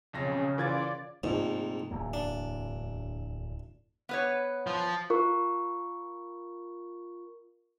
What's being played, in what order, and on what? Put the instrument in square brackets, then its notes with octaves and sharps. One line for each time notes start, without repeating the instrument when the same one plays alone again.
[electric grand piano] B1 F2 A#6 [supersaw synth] C#3
[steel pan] C#3 F4 A#4 [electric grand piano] E3 G#6 A6 [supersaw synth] D5
[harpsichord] A#1 G#2 [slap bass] C3 A3
[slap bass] D1 E2 A#3
[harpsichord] D4
[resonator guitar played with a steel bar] B3 B4 C#5
[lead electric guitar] F3
[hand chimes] F4 A#4 C#6